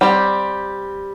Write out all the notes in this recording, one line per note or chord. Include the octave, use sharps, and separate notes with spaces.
G3 C4 G4